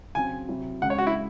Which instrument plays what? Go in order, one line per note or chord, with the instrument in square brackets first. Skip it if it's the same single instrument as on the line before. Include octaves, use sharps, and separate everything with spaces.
[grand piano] C#3 F#3 C4 [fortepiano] G#5
[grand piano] C3 F#3 C4 E4
[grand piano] C#2 C#3 G#3 [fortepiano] F#5
[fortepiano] C#5
F#4
E4